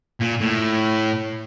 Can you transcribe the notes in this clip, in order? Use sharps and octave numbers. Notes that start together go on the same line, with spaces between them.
A#2
A2